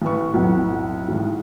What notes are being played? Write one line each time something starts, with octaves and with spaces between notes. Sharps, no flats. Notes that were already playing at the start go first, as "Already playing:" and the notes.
A1 B4 C#6
B1 F2 A2 F#5
A1 G#2